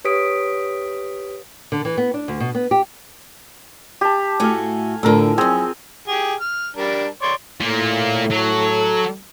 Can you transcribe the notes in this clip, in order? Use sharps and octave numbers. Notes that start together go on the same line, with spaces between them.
G4 B4 C#5 D#6 B6 D7
D3
E3
B3
D4
D2
B2
B3
G4
G4 A5
A2 A3 F#4 F5 G#5
A2 D3 F3 A#4 E6
F#2 C4 C#4 G#4
G4 G#4
F6
G3 D4 A#4
C#5 D5 C6
A2 A#3 F4
F#3 A4